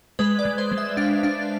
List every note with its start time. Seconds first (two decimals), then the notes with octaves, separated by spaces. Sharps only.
0.19 G#3 B4
0.39 D5
0.45 G#3
0.58 C5
0.72 G#3
0.78 E5
0.97 D4 F5
1.23 D4 F5